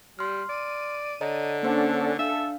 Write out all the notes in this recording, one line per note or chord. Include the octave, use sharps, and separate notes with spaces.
G3 C6 F6
D5 D#7
D3 C#5 D#5 A#5
A#3 C#4 D4 A4 C5 F#5
D4 A4 E5 F5